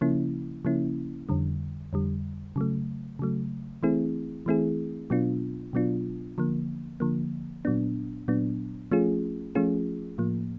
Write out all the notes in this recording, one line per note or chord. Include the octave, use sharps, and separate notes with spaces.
C#3 F3 A#3 C#4 E4
C#3 F3 A#3 C#4 E4
F2 D3 G3
F2 D3 G3
C#3 F#3 A3
C#3 F#3 A3
E3 A3 C4 E4 G#4
E3 A3 C4 E4 G#4
B2 F#3 B3 D4 F4
B2 F#3 B3 D4 F4
D3 F3 A#3
D3 F3 A#3
A#2 F#3 B3 D4
A#2 F#3 B3 D4
F3 A3 C#4 F4 G#4
F3 A3 C#4 F4 G#4
A2 F3 A#3